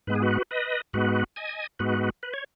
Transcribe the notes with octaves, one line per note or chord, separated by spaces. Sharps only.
G#2 G#3 B3 B4
G#4
F#4 B4
B4 D#5
G#2 G#3 B3 F#4 B4
D#5 G#5
G#2 G#3 B3 F#4 B4
B4
C#5